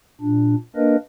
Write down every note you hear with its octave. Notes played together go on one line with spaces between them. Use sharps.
A#2 D4
A#3 D4 A#4 B4 D#5